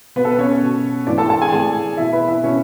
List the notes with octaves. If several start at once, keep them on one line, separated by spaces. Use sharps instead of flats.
B2 B3 B4
A4
B4
C#4 C#5
B2
A2 E3 D4 D5
A4 A5
A4 A5
G#4 G#5
A2 E3 G#4 G#5
B2 E4 E5
B4 B5
E4 E5
B2 C#4 C#5